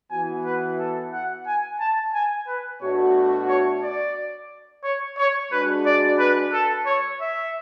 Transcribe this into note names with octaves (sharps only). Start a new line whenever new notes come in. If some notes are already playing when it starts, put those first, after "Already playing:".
E3 B3 F#4 G#5
B4
A4
F#5
G#5
A5
G#5
B4
B2 A3 D4 F#4 C#5
C#5
D5
C#5
C#5
G#3 D4 F#4 B4
D5
B4
A4
C#5
E5